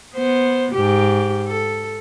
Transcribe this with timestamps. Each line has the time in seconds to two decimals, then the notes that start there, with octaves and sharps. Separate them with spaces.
0.15 B3 C5
0.74 G#2 G4
1.47 A4